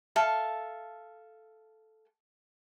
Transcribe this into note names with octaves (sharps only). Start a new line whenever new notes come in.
A4 E5 F5 A5